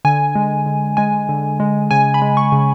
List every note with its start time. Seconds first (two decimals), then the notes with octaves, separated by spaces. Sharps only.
0.05 D3 G#5
0.35 G#3
0.66 D3
0.97 G#3 G#5
1.29 D3
1.60 G#3
1.91 C#3 G#5
2.14 B5
2.22 G#3
2.37 C#6
2.52 C#3